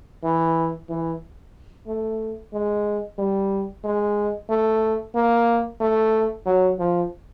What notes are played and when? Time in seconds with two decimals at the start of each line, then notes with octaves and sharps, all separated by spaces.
0.24 E3
0.89 E3
1.87 A3
2.53 G#3
3.18 G3
3.84 G#3
4.49 A3
5.15 A#3
5.81 A3
6.46 F#3
6.79 F3